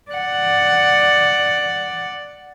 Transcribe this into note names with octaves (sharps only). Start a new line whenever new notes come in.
D5 F#5